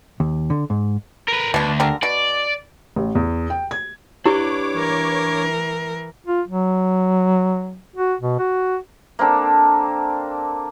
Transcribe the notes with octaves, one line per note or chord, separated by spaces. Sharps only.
D#2
D3
G#2
A#4 B4
D2 B2 D4
D3 G4 A#4
B2 D5
A1
E2
G5
G#6
D4 E4 G4 B4 C#5 C#6 D6
E3 A#4
F4
F#3
F#4
B2
F#4
A#3 C4 D4 A4